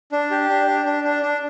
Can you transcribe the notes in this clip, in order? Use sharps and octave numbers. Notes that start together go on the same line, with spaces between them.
D4
G4
D4
D4
D4
D4
D4